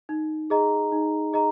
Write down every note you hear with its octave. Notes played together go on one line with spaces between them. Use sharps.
D#4
G#4 D#5 A#5
D#4
G#4 D#5 A#5